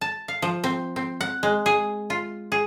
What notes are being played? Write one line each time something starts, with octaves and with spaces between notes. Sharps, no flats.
A5
F5
F3
C4
C4
F#5
G#3
G#4
F4
G#4